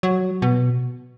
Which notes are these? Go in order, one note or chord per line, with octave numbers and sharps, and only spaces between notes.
F#3
B2